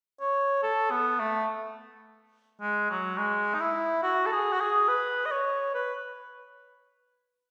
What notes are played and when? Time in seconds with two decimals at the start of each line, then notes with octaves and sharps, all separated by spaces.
0.21 C#5
0.63 A4
0.91 B3
1.19 A3
2.61 G#3
2.90 F#3
3.18 G#3
3.54 D#4
3.60 E4
4.03 F#4
4.26 A4
4.32 G#4
4.53 F#4
4.61 G#4
4.88 B4
5.26 D#5
5.31 C#5
5.74 B4